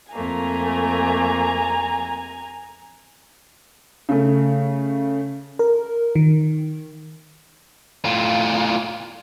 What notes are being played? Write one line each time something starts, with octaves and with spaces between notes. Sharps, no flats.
F2 A3 A#3 G#5 A#5
C#3 A3
A#4
D#3
A2 F4